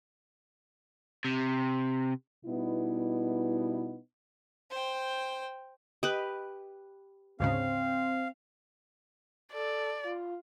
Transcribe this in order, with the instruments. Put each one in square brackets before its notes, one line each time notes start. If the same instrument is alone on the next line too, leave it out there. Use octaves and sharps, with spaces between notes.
[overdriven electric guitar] C3
[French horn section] B2 G3 B3 D#4 E4
[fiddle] C5 G5
[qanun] G4 B4 [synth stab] D#5
[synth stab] D2 G#2 C#3 [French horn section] C4 [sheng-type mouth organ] F5
[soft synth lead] A4 [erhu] D5
[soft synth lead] F4